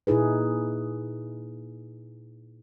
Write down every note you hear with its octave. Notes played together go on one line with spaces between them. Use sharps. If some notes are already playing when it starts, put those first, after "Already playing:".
A#2 D#4 E4 G#4 B4